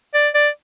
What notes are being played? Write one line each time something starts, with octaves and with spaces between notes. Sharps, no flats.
D5
D5